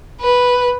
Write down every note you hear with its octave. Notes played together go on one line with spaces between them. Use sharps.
B4